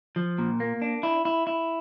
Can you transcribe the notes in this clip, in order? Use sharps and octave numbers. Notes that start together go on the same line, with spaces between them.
F3
A#2
A#3
D4
E4
E4
E4